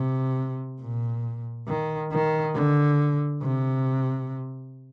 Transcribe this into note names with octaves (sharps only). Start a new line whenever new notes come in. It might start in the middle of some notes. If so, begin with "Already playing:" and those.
Already playing: C3
A#2
D#3
D#3
D3
C3